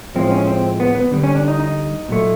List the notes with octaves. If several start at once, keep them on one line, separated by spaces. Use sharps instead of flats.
A2 F3 G#3 C4
C#4
C4
B3
B3
D3 G3
C#4
D4
D#4
D#4
A#2 F#3 A3